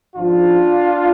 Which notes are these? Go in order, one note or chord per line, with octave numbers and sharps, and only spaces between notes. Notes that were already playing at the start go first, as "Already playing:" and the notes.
G#1 G#2 F3 D4 F4